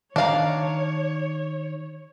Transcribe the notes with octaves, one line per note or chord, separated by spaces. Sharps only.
D#3 D4 C#5 F5 A#5